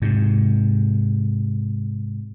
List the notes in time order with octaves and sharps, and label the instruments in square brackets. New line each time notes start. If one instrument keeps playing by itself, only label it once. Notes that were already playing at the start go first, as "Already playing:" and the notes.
[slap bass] G#2 C3